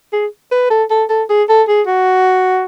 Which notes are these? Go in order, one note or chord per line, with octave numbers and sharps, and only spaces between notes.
G#4
B4
A4
A4
A4
G#4
A4
G#4
F#4